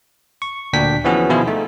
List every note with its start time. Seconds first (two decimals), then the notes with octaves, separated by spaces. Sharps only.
0.42 C#6
0.73 D2 A#2 D4 G5 B6
1.04 E3 F3 B3 C#4 F#4 G#4
1.29 B2 D#3 F3 E4 F4 G#4
1.47 A3 D#4